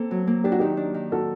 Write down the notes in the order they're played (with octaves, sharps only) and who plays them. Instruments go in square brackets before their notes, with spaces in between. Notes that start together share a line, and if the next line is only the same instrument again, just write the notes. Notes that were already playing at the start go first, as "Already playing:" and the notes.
Already playing: [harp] A#3 C4 [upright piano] A4
[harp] F#3
A#3
[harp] D4 [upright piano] G4
[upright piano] F#4
[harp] D#3 [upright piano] D#4 G4
[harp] D4
D#3
[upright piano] F#4 A4